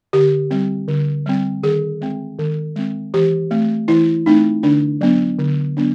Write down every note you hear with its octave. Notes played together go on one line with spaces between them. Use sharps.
D3 G4
G3 C4
D3
G3 C4
D#3 G#4
G#3 C4
D#3
G#3 C4
E3 G4
A3 C4
E3 E4
A3 C4 D#4
D3 D4
F#3 B3 D4
D3
F#3 B3 D4